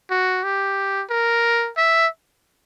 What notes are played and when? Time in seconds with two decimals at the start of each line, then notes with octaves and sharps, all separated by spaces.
0.10 F#4
0.44 G4
1.10 A#4
1.77 E5